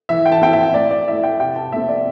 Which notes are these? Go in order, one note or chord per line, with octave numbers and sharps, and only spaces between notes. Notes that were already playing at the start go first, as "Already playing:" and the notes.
E3 E5
G5
A5
C4 E4 G5
E5
A2 D5
D5
A3 E4 E5
G5
C3 G5
A5
A3 C4 E5
D5